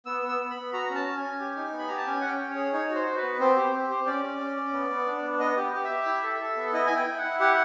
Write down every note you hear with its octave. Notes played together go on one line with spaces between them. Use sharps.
B3 E6
B3
E6
B3
B3 B5
F#4 A#5
C#4
A5
C#4
G#5
C#4
G4
D#4
B3
B5
G4 A#5
A5
C#4 G#5
C#4 F#5
G5
C#4
C#5
G#4
D#4 C#5
F#4
C5
F#4
B4
B3
C4 C5
G4
C4
G4
C#4 D5
C#4
C#4
C#4
B3
B3
D4
B3
B3 D#5
G4
G4
E5
G4
E4
A4
A4
B3
E4 D#5
E4 G#5
G5
E4
F#5
E4
G4 F#5